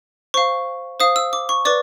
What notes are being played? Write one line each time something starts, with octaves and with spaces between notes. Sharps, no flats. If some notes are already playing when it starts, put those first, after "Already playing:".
C5 F5 C#6
C5 F5 D#6
E6
D6
C#6
B4 D5 D6